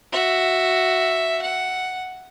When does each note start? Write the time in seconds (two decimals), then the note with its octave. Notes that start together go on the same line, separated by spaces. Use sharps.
0.12 F#4 E5
1.42 F#5